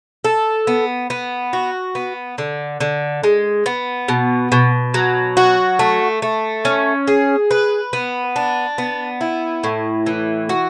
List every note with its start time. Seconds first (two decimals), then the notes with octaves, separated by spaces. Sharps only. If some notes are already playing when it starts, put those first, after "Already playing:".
0.24 A4
0.67 B3
1.10 B3
1.53 F#4
1.95 B3
2.38 D3
2.80 D3
3.23 G#3
3.66 B3
4.08 B2
4.52 B2
4.94 F#3
5.37 F#4
5.79 A3
6.22 A3
6.65 C#4
7.07 G#4
7.51 B4
7.93 B3
8.36 D4
8.78 B3
9.21 E4
9.64 A2
10.06 E3
10.49 F#4